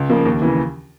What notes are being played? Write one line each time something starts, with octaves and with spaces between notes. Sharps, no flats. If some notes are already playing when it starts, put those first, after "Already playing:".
Already playing: C#2
C#3 F3 A#3
D#2
C#3 E3